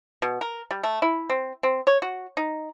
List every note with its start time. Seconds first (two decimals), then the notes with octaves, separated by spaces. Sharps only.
0.22 B2
0.41 A#4
0.71 G3
0.83 A3
1.02 E4
1.30 C4
1.63 C4
1.87 C#5
2.02 F#4
2.37 D#4